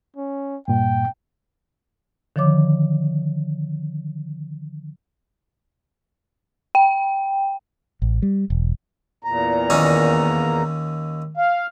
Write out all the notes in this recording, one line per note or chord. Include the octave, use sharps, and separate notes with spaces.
C#4
G2 A#2 G5
D3 D#3 F3 C#5 D6
G5
A1
G3
E1
E2 A#2 A#5
D#2 C#4 D#4
F5